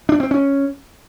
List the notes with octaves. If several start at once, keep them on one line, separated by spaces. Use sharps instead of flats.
D4
C4
C#4